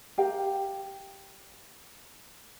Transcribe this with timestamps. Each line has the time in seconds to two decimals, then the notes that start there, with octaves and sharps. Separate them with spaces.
0.18 G4 A#4 F5 G5